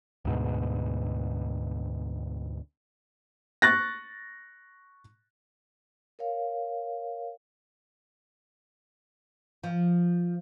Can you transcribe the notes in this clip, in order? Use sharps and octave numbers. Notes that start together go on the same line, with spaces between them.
D2 G#2 B2
C#6 F#6 A6 A#6
A#4 C#5 F5
F3